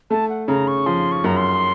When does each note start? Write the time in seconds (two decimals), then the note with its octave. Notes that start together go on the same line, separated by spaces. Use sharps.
0.10 A3 A5
0.29 F#5
0.48 C#3 A#5
0.68 C#6
0.86 F3 C6
1.12 C#6
1.24 F#2 A#5
1.37 C6